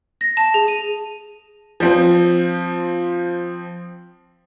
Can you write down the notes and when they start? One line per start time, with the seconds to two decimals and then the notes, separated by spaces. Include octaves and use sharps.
0.21 A#6
0.37 A5
0.54 G#4
0.68 D#7
1.80 F3 C4